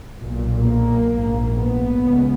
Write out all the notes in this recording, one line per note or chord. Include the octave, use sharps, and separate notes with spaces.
B1 A#2
A#3
A#1 G#2
B3
C#2 C#3